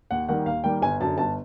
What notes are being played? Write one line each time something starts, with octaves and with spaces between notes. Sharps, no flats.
D#2 F#5
D#3 G3 A#3 F#5
D#2 F5
D#3 G3 A#3 G5
G1 G#5
F#2 D3 A5
G1 A5